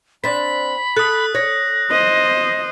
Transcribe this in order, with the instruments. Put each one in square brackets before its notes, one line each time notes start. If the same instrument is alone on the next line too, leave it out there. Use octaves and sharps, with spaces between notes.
[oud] C4 D4 [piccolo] B5 [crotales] B6
[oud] A4 [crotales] D#6 F#6
[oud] C#5 [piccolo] A#6
[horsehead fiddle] C5 D#5